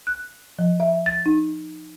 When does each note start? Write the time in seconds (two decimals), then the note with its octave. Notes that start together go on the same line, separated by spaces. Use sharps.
0.07 F#6
0.59 F3
0.80 E5
1.06 A6
1.26 D#4